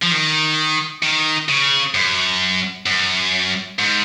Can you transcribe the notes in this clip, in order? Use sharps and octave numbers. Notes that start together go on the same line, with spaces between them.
F3
D#3
D#3
C#3
F#2
F#2
G#2